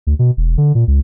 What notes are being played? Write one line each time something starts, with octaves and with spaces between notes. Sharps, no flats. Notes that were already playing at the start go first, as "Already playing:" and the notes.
D2
B2
E1
D3
A#2
C#2